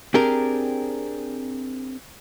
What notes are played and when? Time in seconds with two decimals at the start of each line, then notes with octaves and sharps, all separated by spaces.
0.14 C4 D4 G4 G#4 A#4